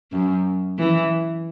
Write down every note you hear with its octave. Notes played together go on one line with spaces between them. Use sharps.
F#2
E3